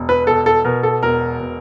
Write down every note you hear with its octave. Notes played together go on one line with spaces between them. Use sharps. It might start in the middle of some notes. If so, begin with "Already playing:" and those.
Already playing: E1
B4
B2 A4
A4
B2 A#4
A4
E1 A#4
B2